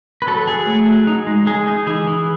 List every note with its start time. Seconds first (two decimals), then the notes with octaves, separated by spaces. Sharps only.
0.22 B4
0.27 F#3 A4
0.47 F#3 G#4
0.67 A3
0.87 F#3
1.07 D#4
1.27 G#3
1.46 G#3 G#4
1.67 D#4
1.87 E3 G#4
2.07 E3